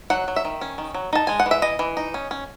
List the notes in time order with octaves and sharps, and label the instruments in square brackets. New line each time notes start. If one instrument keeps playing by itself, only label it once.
[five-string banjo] F#3 F#5
F#3
E5
D#3
C#4
D#3
F#3
D#4 A5
G#3 G#5
F#5
E3
E5
E3 D#5
E3
D#4
C#4
C#4